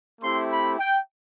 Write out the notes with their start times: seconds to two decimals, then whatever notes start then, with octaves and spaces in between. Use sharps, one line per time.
0.21 A3 C4 E4 G4 C6
0.51 B5
0.79 G5